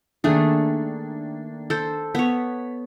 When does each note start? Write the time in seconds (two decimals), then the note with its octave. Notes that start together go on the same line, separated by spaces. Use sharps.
0.24 D#3 A3 A#3 D4 G#4
1.70 A4 C5
2.15 B3 C#5 B6